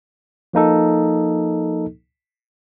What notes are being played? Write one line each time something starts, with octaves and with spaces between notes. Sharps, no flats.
F3 A#3 D#4 A4